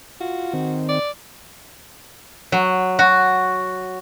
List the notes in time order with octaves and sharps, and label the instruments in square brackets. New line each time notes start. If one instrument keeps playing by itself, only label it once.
[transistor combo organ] F4 [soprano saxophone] F#4
[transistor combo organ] D#3 C4
[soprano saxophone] D5
[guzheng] F#3
F#4